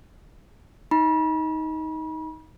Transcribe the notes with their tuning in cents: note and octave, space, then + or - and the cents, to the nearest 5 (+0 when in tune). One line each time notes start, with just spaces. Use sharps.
D#4 +15 B5 -40